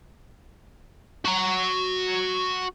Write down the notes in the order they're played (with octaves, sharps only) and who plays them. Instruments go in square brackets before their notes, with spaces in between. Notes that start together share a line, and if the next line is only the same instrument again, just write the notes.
[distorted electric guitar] F#4 A#5